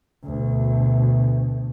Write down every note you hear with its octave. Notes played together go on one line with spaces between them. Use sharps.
D2 B2